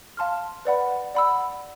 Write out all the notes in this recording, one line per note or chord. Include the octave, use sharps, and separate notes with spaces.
F5 A5 C6 F6
B4 D5 F#5 B5
D5 F#5 B5 E6